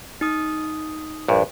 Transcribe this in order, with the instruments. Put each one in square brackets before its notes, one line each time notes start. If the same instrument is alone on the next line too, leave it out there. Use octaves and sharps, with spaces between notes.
[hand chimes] D#4 D#6
[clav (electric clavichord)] A#1 G2